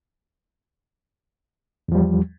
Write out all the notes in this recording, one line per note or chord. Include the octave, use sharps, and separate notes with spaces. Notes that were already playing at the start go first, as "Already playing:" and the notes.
E2 F3 G3